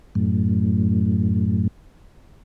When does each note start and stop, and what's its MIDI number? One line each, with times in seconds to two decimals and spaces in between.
0.15 1.67 42
0.15 1.67 45